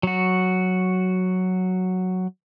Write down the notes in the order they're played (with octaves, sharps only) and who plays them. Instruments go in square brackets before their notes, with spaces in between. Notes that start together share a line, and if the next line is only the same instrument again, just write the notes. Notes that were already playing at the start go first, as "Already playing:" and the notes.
[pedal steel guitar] F#3 F#4